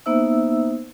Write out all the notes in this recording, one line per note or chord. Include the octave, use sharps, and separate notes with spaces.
A#3 B3 D#4 C5 E5 E6